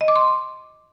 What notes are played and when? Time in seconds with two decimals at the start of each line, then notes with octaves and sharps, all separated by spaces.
0.01 D#5
0.08 D6
0.16 C6